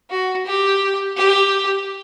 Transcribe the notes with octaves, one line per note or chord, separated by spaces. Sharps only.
F#4
G4
G4